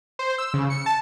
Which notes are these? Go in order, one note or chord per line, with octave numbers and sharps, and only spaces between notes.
C5
E6
C#3
C#7
A5